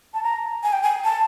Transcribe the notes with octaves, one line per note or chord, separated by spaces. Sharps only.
A5
A#5
G#5
G5
G#5
A5